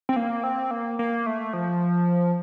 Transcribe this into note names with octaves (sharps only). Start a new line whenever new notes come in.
C4
A#3
C4
A#3
A#3
A3
F3